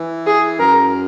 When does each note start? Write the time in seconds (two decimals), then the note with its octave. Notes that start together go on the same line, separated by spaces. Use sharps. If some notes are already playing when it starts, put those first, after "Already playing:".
Already playing: E3
0.27 G#4
0.59 F#2 A#4